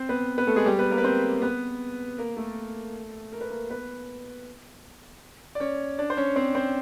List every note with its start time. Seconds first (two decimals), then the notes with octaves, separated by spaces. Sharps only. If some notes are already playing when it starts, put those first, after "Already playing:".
Already playing: C4 C5
0.09 B3 B4
0.38 B3 B4
0.47 A3 A4
0.56 G#3 G#4
0.66 G3 G4
0.79 B3 B4
0.91 A#3 A#4
0.98 B4
1.04 C4 C5
1.42 B3 B4
2.18 A#3 A#4
2.37 A3 A4
3.33 A#4
3.41 B4
3.50 A#3 A#4
3.70 B3 B4
5.55 D5
5.60 C#4 C#5
5.99 D4 D5
6.10 C5
6.17 C#4 C#5
6.36 C4 C5
6.55 C4 C5